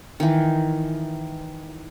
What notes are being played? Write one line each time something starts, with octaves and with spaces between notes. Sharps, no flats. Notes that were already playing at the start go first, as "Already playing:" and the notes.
D#3 E3